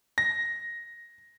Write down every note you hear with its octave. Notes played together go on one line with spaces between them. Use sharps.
A#6